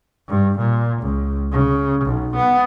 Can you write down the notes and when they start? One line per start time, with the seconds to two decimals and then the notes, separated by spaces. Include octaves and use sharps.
0.29 G2
0.58 A#2
1.02 C#2
1.52 C#3
2.05 B1
2.35 B3